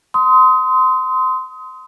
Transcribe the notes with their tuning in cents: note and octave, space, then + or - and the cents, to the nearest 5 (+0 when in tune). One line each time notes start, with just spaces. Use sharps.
C6 -20 D#6 +25